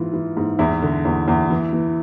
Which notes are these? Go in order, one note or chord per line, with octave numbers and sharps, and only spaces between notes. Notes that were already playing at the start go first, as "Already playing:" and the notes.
Already playing: G#2 E3 F4
E3
G#2
E2 E4
D3
E2
E2
E3
E3